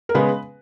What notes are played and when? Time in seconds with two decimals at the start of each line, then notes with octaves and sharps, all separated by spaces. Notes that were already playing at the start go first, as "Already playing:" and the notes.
0.09 A#4
0.14 C#3 G#3 B3 B4